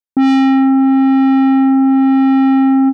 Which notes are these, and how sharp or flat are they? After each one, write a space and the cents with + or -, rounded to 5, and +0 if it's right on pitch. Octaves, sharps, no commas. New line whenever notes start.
C4 +40